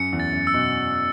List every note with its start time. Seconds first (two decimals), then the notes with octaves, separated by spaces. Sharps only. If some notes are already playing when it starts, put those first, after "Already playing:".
Already playing: F#2 C#7
0.13 E2
0.20 A6
0.33 F#2
0.47 E6
0.54 B2